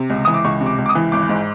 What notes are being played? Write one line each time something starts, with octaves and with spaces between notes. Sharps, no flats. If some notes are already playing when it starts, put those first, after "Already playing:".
Already playing: C3
C#2
E3 D#6
D6
C#2 C#6
C3
D6
C#2
D6
D#6
E3
G#1 D6
G#2